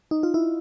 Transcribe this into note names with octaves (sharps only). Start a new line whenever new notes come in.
D#4
F4
E4